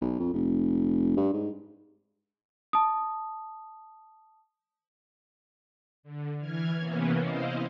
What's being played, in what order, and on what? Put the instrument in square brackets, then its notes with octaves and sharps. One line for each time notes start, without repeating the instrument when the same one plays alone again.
[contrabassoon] B1
F2
F1
G2
G#2
[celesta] A5 D#6
[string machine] D3
E3 F6 G#6
C3 E3 A#3 B3 C#4
E4 C5 D#5 F5